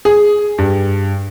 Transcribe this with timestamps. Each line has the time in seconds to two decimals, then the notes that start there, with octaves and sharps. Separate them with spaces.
0.05 G#4
0.58 G2